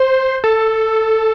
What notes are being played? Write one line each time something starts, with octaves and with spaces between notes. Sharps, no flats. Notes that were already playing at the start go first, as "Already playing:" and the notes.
Already playing: C5
A4